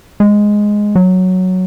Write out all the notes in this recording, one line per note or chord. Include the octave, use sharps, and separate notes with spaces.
G#3
F#3